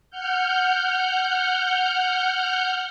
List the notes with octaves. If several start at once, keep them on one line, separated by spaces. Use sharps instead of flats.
F#5 F6 G6